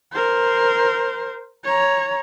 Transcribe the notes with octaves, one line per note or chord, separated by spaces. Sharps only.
A#4 C5
C#5 A#5